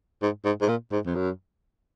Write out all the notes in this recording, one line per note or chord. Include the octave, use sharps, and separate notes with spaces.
G#2
G#2
G#2
A#2
G#2
F2
F#2